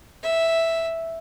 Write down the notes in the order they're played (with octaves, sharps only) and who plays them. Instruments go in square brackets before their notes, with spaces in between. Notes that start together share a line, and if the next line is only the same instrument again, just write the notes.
[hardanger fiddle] E5